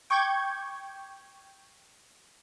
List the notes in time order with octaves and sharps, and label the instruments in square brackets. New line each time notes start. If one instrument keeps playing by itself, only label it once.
[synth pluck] G5 C#6 D6 G6 G#6